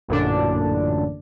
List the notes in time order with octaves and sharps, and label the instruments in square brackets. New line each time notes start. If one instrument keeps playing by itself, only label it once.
[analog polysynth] A1 F#2 A#2 D3 D4